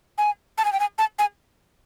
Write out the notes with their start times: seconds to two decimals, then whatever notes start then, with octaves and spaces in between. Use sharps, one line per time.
0.18 G#5
0.58 A5
0.65 G#5
0.73 G5
0.80 G#5
0.98 A5
1.19 G#5